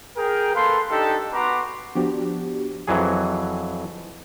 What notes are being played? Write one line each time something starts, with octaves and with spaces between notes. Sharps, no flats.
G#4 A#4 G5
A#3 A4 B4 F5 C6
D4 D#4 G4 A4
B3 F#4 B4 A#5 C6 D6
F3 B3 D4 F#4 G4
F2 E3 F#3 G#4